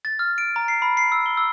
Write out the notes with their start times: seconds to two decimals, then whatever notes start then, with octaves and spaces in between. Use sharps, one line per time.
0.05 A6
0.19 F6
0.38 D7
0.56 A#5
0.68 C7
0.82 B5
0.97 C7
1.12 E6
1.26 G7
1.37 E6